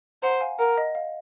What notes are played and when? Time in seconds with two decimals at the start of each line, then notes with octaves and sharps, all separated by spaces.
0.22 C5 F#5 A#5
0.41 F5 G#5
0.59 A#4 F#5
0.77 D#5
0.95 F5